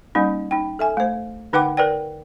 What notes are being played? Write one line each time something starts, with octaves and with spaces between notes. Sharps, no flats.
G3 A#3 C#4 D#4
D#4 G5
A4 E5 G#5
A3 C5
D3 D#4 B4 F#5 G5 D6
A#4 B4 D5 G5